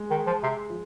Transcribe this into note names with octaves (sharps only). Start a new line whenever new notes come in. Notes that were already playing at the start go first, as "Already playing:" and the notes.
Already playing: G#3
D#3
F3
C3
F3